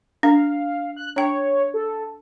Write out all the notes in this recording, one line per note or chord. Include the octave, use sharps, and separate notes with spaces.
D4 F5
F#6
D4 C#5 G5
A4